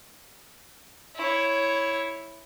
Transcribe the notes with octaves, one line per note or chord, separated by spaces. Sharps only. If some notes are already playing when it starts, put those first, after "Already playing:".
E4 C#5